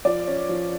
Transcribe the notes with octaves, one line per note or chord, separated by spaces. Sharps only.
F3 D5
C#4
F3